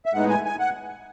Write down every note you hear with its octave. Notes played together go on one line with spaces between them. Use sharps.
E5
A2 G#3 B3 D#4 F#5
G#5
G#5
F#5